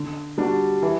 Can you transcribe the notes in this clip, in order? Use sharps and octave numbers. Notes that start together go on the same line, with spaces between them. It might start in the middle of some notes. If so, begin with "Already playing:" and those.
Already playing: D3
G3 D4 F#4
E3